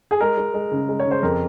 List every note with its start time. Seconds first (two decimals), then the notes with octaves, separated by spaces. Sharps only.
0.11 G#4
0.21 G#3 A#4
0.38 G#3
0.54 G#3
0.72 C#3
0.89 G#3
1.00 C#5
1.06 C#3
1.11 C5
1.23 F2 A#4